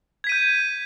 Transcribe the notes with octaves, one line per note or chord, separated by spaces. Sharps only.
G6 G#6 B6 D#7